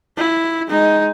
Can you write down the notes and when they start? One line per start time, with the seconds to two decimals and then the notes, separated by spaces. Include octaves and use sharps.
0.17 E4
0.68 G#3 D#4